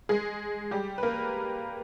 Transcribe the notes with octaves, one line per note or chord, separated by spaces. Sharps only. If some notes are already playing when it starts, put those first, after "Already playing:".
G#3 G#4
G3 G4
B4
A#3 A#4